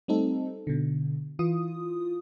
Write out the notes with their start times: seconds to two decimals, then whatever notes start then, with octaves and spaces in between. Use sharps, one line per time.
0.08 G3 A3 C4 D#4 A4
0.67 B2 D3
1.39 E3 F4 D#6